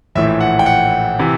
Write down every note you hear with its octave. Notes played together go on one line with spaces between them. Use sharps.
A#1 A2 E3 E5
F#5
G5
F#5
C3 E3